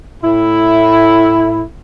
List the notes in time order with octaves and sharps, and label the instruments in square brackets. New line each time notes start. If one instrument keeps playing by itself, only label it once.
[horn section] A2 E4